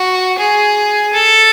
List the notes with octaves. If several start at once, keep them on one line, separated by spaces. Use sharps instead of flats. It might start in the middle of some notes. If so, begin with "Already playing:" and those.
Already playing: F#4
G#4
A4